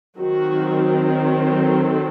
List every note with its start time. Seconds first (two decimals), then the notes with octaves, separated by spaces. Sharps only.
0.19 D#3 F#3 C4 F#4
1.40 A4